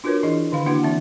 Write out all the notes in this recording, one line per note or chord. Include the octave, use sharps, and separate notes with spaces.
D4 F4 F#4 A#4 B4 C#5
E3 D4 E4 G#4 D#5
D3 D#3 F5 B5
A#3 D4 E4 F#4 B4 F#5
E3 C4 E5 A5